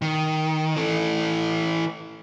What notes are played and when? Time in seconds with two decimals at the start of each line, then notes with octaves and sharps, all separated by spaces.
0.02 D#3
0.76 E3 A4